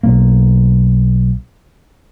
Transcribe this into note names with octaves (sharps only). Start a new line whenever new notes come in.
B1 A#3